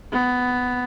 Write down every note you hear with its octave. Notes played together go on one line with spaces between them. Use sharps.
B3